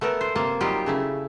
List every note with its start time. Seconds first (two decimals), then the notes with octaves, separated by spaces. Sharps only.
0.01 A3 B3 A4 A#4
0.21 C5
0.36 C3 A#3 C5 A5
0.61 F#3 G3 D#4 F4 G4 A#4
0.86 C#3 A3 E4